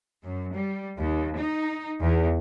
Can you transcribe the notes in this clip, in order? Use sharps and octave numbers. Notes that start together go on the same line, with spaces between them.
F#2
G3
D#2
D#4
E2